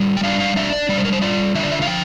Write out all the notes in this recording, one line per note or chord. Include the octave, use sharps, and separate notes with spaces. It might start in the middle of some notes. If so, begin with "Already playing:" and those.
Already playing: G3 F4
G5
D4 F5
F5
D4 E5
D5
G3 D5
C5
A#4
C5
F4 D5
D3 E5
D5
E5
F5
F3 G5